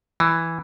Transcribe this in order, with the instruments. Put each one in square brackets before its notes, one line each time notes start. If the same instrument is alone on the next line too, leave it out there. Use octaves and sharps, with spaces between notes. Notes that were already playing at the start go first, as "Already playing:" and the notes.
[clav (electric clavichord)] E3